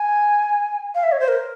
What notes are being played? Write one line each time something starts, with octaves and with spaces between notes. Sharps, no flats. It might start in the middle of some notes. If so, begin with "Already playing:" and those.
Already playing: G#5
F5
E5
C#5
C5
A#4